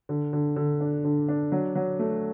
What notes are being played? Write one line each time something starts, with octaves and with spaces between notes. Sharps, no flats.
D3
D3
D3
D4
D3
D4
F#3
F#3
A3